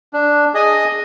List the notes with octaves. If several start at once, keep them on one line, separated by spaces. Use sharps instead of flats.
D4
G#4 D#5 G#5